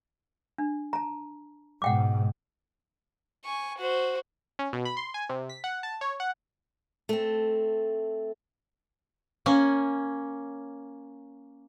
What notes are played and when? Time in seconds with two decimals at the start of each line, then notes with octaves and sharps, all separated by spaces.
0.58 D4
0.93 A5 A#5
1.82 G#2 B2 F#5 G5 D6
3.45 G#5 C#6
3.78 F#4 C5
4.59 C#4
4.73 B2
4.85 B5
4.97 C6
5.14 G#5
5.29 C3
5.50 B6
5.64 F#5
5.83 A5
6.01 C#5
6.20 F#5
7.09 A3 C4
9.46 A#3 C#4 G#5